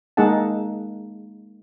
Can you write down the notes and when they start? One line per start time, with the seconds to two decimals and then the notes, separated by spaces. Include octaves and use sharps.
0.17 G#3 A#3 D#4 G#4 F#5 A5